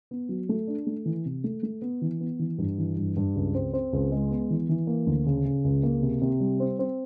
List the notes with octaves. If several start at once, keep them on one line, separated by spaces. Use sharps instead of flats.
B3
F#3
A3
D4
A3
E3
C3
A3
A3
B3
E3
B3
E3
G2
E3
G2
G2
C#2
C4
C4
C#2
G#3
B3
E3
E3
A#3
D2
C#3
C#3
C#2
A#3
C3
C3
G3
C4
C4